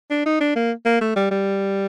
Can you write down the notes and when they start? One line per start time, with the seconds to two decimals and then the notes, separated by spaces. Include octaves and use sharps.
0.10 D4
0.26 D#4
0.41 D4
0.56 A#3
0.85 A#3
1.01 A3
1.16 G3
1.31 G3